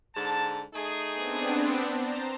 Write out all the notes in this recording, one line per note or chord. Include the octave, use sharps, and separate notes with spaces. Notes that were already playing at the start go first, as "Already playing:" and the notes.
G#2 D3 A5
A3 D#4 G#4
B3 C4 D4
C5 A5 A#5